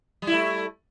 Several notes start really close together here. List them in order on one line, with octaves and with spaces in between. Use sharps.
G3 E4 A3